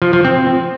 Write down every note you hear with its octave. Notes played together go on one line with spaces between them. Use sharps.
F3
F3
C4